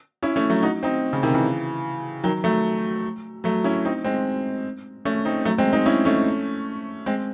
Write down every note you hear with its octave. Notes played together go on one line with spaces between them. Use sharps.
C#4 E4
A3 C#4
F#3 A3
D#4 F#4
C4 D#4
C#3
C3 D#3
C#3 E3
D#3 F#3
F#3 A3
F#3 A3
C#4 E4
C4 D#4
G#3 C4
A3 C#4
C4 D#4
F#3 A3
G#3 C4
C4 D#4
C#4 E4
A3 C#4
G#3 C4